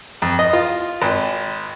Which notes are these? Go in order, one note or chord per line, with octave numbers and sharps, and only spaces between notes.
F2
D#5
F4
G#1